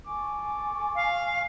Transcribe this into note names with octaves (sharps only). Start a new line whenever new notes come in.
A4 G#5 C#6 D6
F5